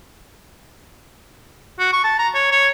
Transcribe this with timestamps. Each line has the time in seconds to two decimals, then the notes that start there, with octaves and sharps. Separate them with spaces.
1.79 F#4
1.93 C#6
2.04 A5
2.19 A#5
2.35 C#5
2.51 C#5